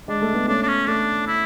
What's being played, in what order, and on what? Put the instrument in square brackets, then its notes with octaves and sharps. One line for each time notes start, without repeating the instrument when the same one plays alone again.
[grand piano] G#3 [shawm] D4
[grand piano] A3
G#3 B3
[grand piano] A3 C#4 [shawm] D4
[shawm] D4
C#4
[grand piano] A3 [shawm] D4
[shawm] E4